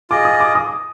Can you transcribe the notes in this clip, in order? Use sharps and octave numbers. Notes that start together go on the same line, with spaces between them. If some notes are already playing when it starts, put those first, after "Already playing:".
F4 G#4 D#5 D6
D#6
D6
D#6